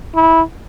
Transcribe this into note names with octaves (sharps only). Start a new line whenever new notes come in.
E4